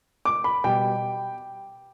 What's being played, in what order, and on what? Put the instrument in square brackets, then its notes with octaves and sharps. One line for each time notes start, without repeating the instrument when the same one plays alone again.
[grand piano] D6
B5
B2 G3 G5